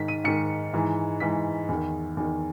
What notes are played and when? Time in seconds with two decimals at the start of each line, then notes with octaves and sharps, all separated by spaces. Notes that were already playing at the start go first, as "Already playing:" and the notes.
Already playing: G#2 D#3 B6
0.08 D#7
0.24 G#2 D#3 C#7
0.74 G#2 E3
1.20 G#2 E3 B6
1.69 E2 D#3
2.17 E2 D#3